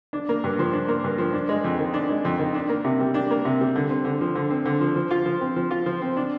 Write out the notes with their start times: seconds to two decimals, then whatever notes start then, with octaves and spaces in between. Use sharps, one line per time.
0.13 D4
0.29 A#3
0.44 G2
0.59 F3
0.73 D4
0.88 A#3
1.04 G2
1.18 F3
1.33 D4
1.49 G#3
1.64 F2
1.79 D#3
1.94 D4
2.09 G#3
2.25 F2
2.39 D#3
2.54 D4
2.69 A#3
2.84 C3
3.00 G3
3.14 D4
3.31 A#3
3.45 C3
3.61 G3
3.76 D3
3.90 C4
4.05 D3
4.21 F3
4.35 D3
4.50 C4
4.65 D3
4.81 F3
4.96 F3
5.11 F4
5.26 F3
5.41 C4
5.56 F3
5.71 F4
5.86 F3
6.02 C4
6.17 D4